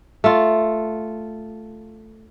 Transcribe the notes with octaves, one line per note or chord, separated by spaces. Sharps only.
A3 F4